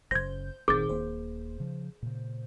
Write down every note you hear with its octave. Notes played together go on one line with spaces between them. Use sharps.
F#1 A#2 C#3 C5 G6 G#6 A#6
G1 A#2 D#3 C4 G#4 D6 G6 A6
D#1 A#3 C5
C#3 F3
A#2 C#3